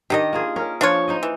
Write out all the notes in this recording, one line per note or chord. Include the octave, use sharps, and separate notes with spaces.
D#3 D4 D#4 G4 D#5
A#3 F4 G#4
C#4 A#4
F3 D4 F4 C#5
D#4 C5 D#5
E3